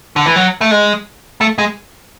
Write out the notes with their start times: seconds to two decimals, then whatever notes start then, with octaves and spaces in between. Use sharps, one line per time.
0.16 D3
0.26 E3
0.36 F#3
0.61 A3
0.71 G#3
1.41 A3
1.58 G#3